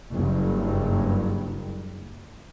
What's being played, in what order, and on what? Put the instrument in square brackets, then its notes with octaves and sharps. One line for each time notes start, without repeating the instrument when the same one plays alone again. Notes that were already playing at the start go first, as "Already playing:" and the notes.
[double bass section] F#1 G2